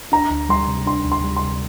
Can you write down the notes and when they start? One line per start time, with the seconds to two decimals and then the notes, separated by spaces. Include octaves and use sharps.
0.12 D4 A#5
0.30 D2
0.49 G3 C6
0.68 C3
0.86 D4 C6
1.05 D2
1.12 C6
1.24 G3
1.36 C6
1.43 C3